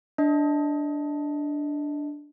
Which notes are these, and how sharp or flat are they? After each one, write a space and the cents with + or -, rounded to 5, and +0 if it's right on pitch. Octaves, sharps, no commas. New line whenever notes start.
D4 +0 D#5 +25